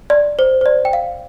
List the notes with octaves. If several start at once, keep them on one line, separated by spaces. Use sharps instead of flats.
D5
C5
C5
D5
G5
F5